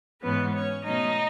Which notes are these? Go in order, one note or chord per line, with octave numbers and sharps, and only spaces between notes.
G#2 E3 G#3 B3 C#4 B4
C#4 C#5
B2 F#3 A3 C#4 D#4 D#5